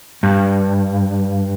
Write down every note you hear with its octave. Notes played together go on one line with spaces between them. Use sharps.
G2